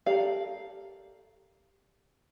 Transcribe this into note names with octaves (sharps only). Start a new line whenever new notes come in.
G4 A4 A#4 D5 F5